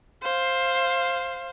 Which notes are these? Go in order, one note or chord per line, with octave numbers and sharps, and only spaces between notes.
C5 F5